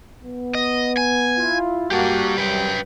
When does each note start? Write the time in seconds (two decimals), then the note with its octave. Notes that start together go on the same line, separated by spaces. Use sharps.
0.23 B3
0.55 D#5
0.97 G#5
1.37 E4 F4
1.91 G3 A#3 F#4 G4 A5
2.38 C2 F#2 B4 G5